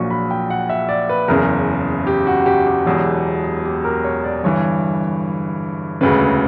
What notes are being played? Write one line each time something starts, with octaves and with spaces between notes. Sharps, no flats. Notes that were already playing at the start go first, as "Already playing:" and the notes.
Already playing: A#1 A#2 F#3 C#6
B5
G5
F#5
E5
D5
B4
F#1 E2 C#3 A#4
G4
F#4
F#4
G4
G4
E1 E2 B2 F#3
G4
A#4
C#5
D5
G1 G2 E3 C#5
E1 D2 C#3 B4